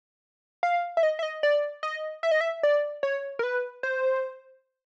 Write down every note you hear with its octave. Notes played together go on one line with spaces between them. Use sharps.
F5
E5
D#5
E5
D#5
D5
D#5
E5
D#5
E5
D5
C#5
A#4
B4
C5